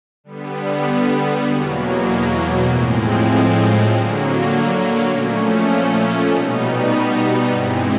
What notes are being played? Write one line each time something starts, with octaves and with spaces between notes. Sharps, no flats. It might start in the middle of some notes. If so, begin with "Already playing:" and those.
D3 G3 B3
E2 B2 F#3 A#3
A2 F3 G#3 C4
D3 F#3 A#3
A#2 F3 A3 C#4
B2 G3 B3 D#4
G2 E3 G#3 C4